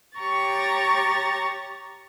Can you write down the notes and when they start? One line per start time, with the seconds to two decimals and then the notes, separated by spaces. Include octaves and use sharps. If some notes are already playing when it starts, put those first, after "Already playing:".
0.18 G4 C#5 A#5 C#6 A6